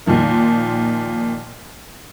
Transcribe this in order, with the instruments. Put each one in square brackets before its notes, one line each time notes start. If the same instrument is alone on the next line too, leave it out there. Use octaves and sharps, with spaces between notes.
[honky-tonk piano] A#2 D#3 F3 A#3